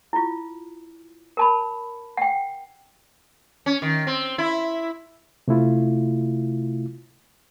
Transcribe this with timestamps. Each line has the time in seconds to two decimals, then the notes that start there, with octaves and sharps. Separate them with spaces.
0.13 E4 F4
1.37 A#4 A5 B5
2.17 F#5 G5
3.66 C#4
3.82 D#3
4.07 C4
4.38 E4
5.48 C3 A3 E4 F4